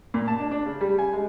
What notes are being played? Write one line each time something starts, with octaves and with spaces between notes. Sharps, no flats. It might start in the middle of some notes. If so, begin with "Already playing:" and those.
A#2
A5
D4
D4
C#3
G3
G#5
G#3